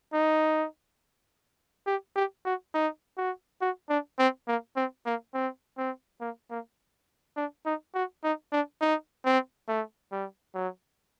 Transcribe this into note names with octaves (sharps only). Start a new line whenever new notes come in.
D#4
G4
G4
F#4
D#4
F#4
F#4
D4
C4
A#3
C4
A#3
C4
C4
A#3
A#3
D4
D#4
F#4
D#4
D4
D#4
C4
A3
G3
F#3